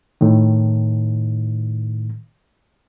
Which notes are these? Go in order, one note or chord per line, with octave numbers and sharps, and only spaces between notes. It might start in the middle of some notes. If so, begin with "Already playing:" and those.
A2 D#3